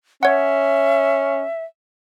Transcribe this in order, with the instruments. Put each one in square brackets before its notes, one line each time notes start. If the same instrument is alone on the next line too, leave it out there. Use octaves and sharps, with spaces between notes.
[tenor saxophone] C#4 [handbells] C#5 F#5 [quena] E5